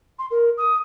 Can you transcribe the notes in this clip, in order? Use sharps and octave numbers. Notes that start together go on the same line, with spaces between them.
C6
A#4
D#6